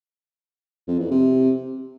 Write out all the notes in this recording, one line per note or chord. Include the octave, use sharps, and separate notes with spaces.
F2
E2
C3